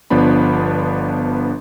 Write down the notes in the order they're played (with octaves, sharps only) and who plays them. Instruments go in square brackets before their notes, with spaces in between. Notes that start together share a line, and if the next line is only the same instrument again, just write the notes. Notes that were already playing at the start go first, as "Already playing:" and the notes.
[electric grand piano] G1 F3 B3 D4 B5